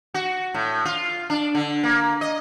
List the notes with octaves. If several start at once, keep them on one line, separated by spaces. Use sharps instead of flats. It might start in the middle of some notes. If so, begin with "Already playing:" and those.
F#4
A2
F4
D4
D3
A#3
D#5